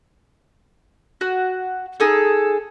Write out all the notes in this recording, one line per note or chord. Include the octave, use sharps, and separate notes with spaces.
F#4
D#4 G#4 A4